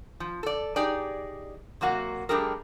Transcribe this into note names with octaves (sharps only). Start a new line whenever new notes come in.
F3
A4 D5
D#4 G4 G#4 D5
C3 F#3 A#3 F#4
G3 A3 D4 G4 G#4 A#4